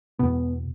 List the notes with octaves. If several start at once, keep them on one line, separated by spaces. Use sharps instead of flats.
E2 B2 B3